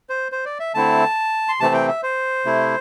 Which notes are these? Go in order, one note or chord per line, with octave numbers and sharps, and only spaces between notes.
C5
C5
D5
E5
D3 A3 C4 E4 A5
C6
C3 E3 A3 C4 A5
G5
E5
C5
C3 A3 E4